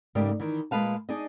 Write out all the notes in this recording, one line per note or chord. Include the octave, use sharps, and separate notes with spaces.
G#2 C#3 A3 G4 A#4 D5
D#3 E3
A#2 G#3 B4 F5 A5
D4 D#4 G#4 D5 D#5